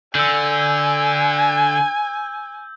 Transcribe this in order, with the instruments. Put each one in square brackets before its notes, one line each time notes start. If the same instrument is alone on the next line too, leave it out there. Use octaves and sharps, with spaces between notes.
[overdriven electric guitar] D3 [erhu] G#5 [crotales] E6 G6